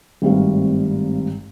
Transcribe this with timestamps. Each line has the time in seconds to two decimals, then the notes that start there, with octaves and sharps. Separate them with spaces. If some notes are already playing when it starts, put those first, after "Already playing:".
0.22 G#1 G2 G3 A3 C4 F5